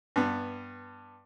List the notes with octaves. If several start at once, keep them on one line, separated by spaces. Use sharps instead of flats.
G2 B3